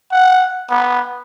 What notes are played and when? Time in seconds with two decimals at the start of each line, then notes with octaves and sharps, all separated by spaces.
0.12 F#5
0.70 B3